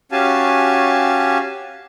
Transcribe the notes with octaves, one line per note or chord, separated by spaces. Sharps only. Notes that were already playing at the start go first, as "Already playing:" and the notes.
C#4 F#4 G4 F5 G#5 A5